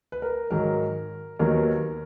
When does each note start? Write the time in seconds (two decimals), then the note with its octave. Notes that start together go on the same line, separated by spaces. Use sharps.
0.12 B4
0.22 A#4
0.51 G#2 D#3 F#3 A#4
1.39 D#2 D#3 F#3 B3 A#4